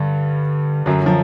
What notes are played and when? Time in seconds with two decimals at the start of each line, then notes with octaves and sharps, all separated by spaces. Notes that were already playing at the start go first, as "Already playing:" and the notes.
Already playing: G2 D3 G3
0.86 F#2 D3 F#3
1.01 F#3
1.06 F3